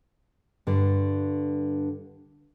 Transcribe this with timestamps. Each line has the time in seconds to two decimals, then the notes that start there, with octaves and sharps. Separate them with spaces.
0.67 G2 D3